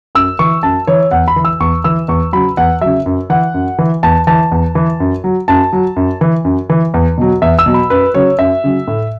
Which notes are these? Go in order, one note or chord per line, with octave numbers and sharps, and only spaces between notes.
F#2 E6
E3 C#6
F#2 A5
E3 C#5
E2 F#5
B5
E3
E6
E2 C#6
E3 E6
E2 C#6
C#3 F#3 B5
E2 F#5
C#3 F#3 E5
F#2
E3 F#5
F#2
E3
E2 A5
E3 A5
E2
E3
F#2
F#3
F#2 A5
F#3
F#2
E3
F#2
E3
E2
B2 F#3
E2 E5
E6
B2 F#3
B5
F#2 B4
C#3 F#3 C#5
F#2 E5
C#3 F#3
A2